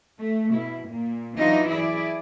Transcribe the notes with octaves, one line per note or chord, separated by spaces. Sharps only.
A3
B2 E4
A#2 A#3
E3 F#3 D4 D#4 F4
E4 G#4 D5